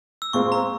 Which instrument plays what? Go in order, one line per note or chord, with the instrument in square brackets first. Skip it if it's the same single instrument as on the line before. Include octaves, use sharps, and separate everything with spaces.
[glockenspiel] E6
[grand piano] A#2 G#3 C4 [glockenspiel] C#6
[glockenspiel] A#5